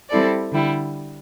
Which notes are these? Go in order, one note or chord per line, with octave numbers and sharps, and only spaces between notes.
G3 C4 E4 A4 D5
D3 G3 E4